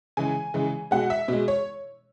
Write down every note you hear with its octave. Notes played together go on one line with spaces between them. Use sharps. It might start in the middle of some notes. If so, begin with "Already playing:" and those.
C#3 E3 G#3 G#5
C#3 E3 G#3
B2 G#3 F#5
E5
B2 G#3
C#5